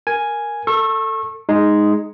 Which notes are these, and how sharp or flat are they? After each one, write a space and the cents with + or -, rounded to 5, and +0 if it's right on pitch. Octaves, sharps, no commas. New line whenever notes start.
A#4 +0 G#5 +0
A4 +20 C#6 -30 E6 +0
G#3 +0 D#4 +0